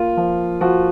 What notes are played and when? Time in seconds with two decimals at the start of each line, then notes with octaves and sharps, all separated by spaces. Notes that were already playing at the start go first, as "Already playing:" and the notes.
Already playing: A#3 F4
0.17 F3
0.61 F3 F#4